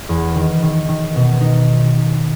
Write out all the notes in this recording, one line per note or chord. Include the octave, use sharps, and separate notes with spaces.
E2
D#3
D#3
D#3
B2
D#4